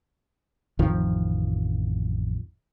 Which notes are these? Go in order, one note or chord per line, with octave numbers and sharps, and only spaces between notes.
A1 F2 D#3 F3